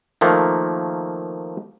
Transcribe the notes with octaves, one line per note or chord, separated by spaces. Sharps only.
D#3 F3 A3 A#3